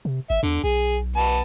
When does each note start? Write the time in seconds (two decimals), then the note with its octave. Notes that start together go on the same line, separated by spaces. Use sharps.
0.05 C3
0.30 G#1 E5
0.43 E2 D3
0.64 B1 G#4
1.16 B3 A5